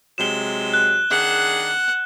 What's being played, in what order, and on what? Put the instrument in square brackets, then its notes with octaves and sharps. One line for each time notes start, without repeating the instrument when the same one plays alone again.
[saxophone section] C3 F#3 G#3 [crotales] E7 G7
[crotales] F#6
[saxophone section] D#3 D4 G#4 [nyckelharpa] F#5